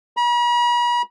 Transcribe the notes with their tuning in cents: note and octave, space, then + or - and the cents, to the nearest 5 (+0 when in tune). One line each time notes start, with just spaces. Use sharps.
B5 -45